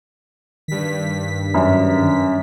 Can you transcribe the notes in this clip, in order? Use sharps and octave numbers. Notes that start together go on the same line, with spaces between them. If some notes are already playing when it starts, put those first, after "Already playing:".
G2 D#3 B6
F#2